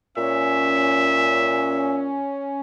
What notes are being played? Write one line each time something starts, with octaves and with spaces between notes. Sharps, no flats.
A#2 C#4 E5